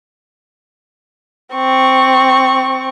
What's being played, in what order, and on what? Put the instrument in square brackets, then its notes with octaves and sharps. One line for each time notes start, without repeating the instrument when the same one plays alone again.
[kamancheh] C4 C#6